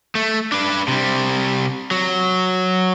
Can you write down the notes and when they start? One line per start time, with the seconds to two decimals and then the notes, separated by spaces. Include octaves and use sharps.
0.15 A3
0.52 D4 B4
0.88 C3 G3
1.91 F#3